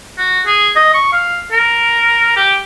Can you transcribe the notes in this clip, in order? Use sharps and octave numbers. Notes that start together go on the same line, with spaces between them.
F#4
G#4
D#5
C#6
F5
A#4
G4